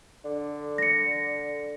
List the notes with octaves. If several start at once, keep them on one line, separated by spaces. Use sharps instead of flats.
D3
A#6 C#7